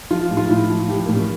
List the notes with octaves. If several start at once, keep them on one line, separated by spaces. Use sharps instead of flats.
F3 F4
A2
F4
A2 E4
F3
E3 G4
A2 A#3
C#4